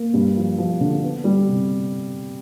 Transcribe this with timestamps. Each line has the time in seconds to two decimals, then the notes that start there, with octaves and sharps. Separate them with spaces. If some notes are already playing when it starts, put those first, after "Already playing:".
Already playing: A#3
0.14 G2
0.37 F3
0.58 F3
0.80 D3
1.03 B3
1.24 G3
1.47 C3